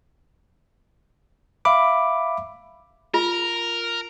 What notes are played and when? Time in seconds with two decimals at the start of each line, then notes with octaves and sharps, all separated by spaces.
1.65 E5 F5 B5 D6
3.14 F4 A#4